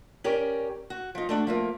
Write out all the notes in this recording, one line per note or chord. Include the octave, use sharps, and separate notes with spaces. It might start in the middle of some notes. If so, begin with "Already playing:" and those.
C#4 G4 A#4 D5
F#4
F3 D#4
A3 D4 F#4
F3 A3 A#3